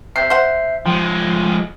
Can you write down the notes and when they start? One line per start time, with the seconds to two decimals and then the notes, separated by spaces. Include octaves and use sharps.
0.16 C3 E5 G6 C7
0.30 C5 F#5
0.86 F3 G#3 G5